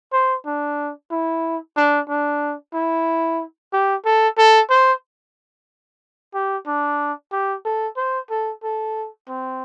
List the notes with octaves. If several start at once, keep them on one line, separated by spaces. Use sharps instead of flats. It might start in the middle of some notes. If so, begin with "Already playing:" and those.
C5
D4
E4
D4
D4
E4
G4
A4
A4
C5
G4
D4
G4
A4
C5
A4
A4
C4